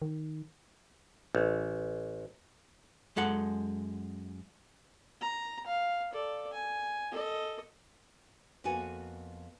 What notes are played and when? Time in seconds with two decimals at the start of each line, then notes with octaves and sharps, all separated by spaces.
0.02 D#3
1.35 A1
3.16 F#2 G#3 A4 F#5
5.21 A#5
5.67 F5
6.13 A4 D5
6.53 G#5
7.12 A4 D#5
8.64 F2 A#3 B3 F#4 G#5